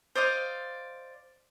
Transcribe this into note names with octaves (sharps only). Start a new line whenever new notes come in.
C5 D5 D#5 F5